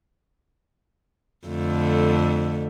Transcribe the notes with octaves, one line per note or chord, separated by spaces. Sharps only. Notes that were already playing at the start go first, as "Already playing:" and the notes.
F2 D3 A3